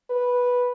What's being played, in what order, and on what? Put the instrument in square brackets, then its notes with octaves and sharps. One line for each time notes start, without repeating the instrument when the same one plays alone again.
[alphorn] B4